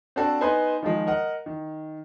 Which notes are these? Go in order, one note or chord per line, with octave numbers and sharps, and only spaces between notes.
C4 D4 F#4 A4
B3 D#4 B4 C5 G#5
D#3 F3 G#3
A#4 D#5 F#5
D#3